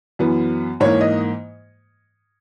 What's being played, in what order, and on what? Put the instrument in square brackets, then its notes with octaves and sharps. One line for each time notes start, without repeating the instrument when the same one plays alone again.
[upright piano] F#2 E3 B3
G#2 E3 A#3 C#5
D#5